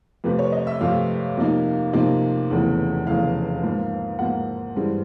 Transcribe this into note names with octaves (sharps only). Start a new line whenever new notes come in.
F2 C3 F3 A3 B4
C#5
D#5
E5
F2 C3 F3 A3 F5
F2 C3 F3 A#3 D#4
F2 C3 F3 A#3 D#4
F1 E2 C#3 E3 A3
F1 E2 C#3 E3 A3 F5
G#2 F3 A#3
G#2 F3 A#3 F#5
G2 E3 G#3 C4